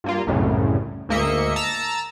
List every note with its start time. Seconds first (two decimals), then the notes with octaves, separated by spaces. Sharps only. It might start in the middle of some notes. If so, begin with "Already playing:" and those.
0.04 G2 A#3 F4
0.27 C2 F#2 A2 C#3
1.09 D2 G#2 A#3 D#5 E5 C#7
1.56 A5 A#5 E6 A6